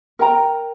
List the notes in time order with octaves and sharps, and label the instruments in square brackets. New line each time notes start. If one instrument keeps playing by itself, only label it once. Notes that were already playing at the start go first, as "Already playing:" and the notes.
[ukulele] A#4 G5 A#5